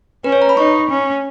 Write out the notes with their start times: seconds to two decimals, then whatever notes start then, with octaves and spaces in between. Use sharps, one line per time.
0.24 C#4 B4
0.32 C#5
0.42 A#5
0.49 B5
0.57 D#4 C#6
0.90 C#4